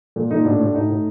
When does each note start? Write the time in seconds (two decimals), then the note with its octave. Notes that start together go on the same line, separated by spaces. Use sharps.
0.16 A#2
0.31 A#2 D#4
0.45 A2 D4
0.60 A2
0.75 A2 D#4
0.89 A2